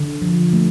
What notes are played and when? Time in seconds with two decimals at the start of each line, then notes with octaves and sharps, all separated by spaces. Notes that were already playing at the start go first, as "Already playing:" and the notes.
Already playing: D3
0.22 F3
0.53 A3